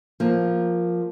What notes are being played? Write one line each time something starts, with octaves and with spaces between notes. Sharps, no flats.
F3 A#3